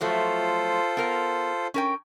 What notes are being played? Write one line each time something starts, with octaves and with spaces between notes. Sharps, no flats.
F3 F#3 A3 F4 A4 C5
B3 A#4 A#5
C#4 A#4 G5